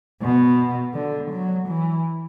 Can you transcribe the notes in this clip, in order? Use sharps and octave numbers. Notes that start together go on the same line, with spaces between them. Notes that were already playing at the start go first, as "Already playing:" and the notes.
B2
D3
F#3
E3